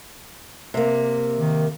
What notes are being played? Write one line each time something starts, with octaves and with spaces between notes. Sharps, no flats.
C3 A#3
D#3